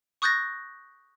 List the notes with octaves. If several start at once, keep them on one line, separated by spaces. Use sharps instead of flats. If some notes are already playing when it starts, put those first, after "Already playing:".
C#6 D#6 F#6 G6 A6 A#6